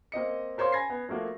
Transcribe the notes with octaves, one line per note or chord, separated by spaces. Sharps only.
A#3 C4 D#5 C#7
A#4 C5 C#5 F5 C6
G#5 B5 G#6 A#6 C7
B3
F3 A3 A#3 F#4 A4